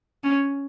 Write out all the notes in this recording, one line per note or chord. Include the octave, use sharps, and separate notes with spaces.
C#4